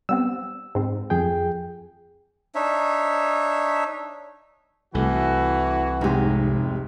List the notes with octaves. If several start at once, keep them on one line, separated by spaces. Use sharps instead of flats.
G3 B3 C4 E6
G#2 C4
F2 G#4 G5
D4 D#4 C#5 E5
C2 E3 A3 F#4
F1 G#2 C3 G#3 G4